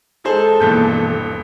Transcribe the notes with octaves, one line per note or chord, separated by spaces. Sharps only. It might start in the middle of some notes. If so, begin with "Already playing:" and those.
G#3 D#4 G#4 A4 C5
D#1 G2 B2 E3 A#3 G6